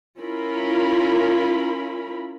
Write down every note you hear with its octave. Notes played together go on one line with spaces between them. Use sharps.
C#4 E4 F4 A#4 B5